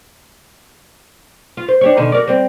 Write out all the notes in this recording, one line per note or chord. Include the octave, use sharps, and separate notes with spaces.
F4
C5
D4 G4 C#5
B2 D3 D#3
F#4 A#4 D5
G3 C4